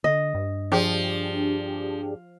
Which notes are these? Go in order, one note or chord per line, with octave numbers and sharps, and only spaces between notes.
D3 D#5
G2
F3 D4 G4 G#4